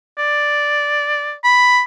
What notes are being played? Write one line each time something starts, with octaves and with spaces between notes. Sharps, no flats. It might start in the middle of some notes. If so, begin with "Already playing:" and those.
D5
B5